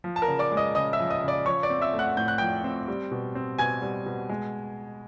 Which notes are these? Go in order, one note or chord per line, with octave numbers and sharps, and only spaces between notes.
F3
A5
A#4 A#5
C#3
D5 D6
G#3
D#5 D#6
C#3 D#5 D#6
E5 E6
F3
D#5 D#6
C#3
D5 D6
F3 C#5 C#6
D5 D6
C4
E5 E6
A3
F#5 F#6
A2 G6
F#6
F3 G5 G6
C4
G3
B2
C4
B2 G#5 G#6
G3
B2
G#3